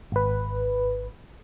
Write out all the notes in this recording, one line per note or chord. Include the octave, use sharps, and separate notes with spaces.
G#1 B4